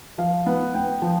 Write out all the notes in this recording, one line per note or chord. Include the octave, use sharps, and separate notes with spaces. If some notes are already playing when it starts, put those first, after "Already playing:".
F3 F5
B3
B3 G5
F3